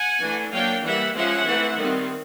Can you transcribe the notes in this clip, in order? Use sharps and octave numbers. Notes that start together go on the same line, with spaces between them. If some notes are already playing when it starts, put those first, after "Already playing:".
Already playing: F#5 G#5
E3 A3 D4
F#3 A#3 D4 F5 G5
E3 G3 A#3 E5 F#5
F3 G#3 C#4 E5 F#5
E3 A3 C4
D#3 G3 C4